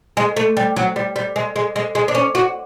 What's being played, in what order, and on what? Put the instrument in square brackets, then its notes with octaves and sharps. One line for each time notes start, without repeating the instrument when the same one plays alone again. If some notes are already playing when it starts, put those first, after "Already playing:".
[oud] G#3
A3
G3
F#3
G3
G3
G#3
G#3
G#3
G#3
D4
C#4
F#4